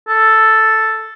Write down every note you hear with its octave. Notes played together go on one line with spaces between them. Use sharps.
A4